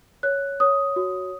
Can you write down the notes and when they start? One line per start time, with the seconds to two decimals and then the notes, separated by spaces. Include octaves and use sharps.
0.23 C#5 F#6
0.60 C#5 D#6
0.96 F#4